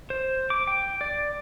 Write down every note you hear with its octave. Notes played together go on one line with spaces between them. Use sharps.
C5
D6
G5
D5